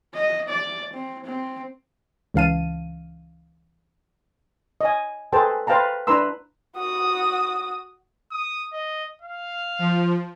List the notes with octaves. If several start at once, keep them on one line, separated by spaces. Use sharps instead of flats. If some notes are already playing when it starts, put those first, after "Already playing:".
D#5
D5
C4
C4
C#2 C#3 E3 F5 A5 D#7
D#5 G#5
G#4 A4 B4 C5 G5 A5
B4 C5 F5 G5 A5 A#5
D4 E4 B4 A#5 C6 E6
F#4 D#6
D#6
D#5
F5
F3